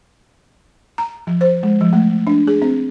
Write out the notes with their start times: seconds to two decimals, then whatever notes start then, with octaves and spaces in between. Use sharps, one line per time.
0.98 A#5
1.27 F3
1.41 C5
1.63 G#3
1.81 F3
1.93 A3
2.27 D4
2.47 G#4
2.62 C4